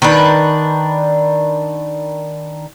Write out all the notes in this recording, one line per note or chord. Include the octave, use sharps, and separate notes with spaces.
D#3 D4 B4